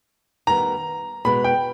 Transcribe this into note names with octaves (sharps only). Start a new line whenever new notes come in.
D#3 G3 B3 A#5
B2 G#3 B3 B5
G5